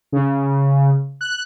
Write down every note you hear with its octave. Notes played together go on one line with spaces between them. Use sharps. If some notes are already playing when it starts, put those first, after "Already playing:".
C#3
F#6